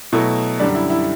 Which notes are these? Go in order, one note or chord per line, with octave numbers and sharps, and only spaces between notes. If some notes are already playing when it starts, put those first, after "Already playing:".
B2 F#3 A3 E4
F#2 D3 G3 D4
E4
E4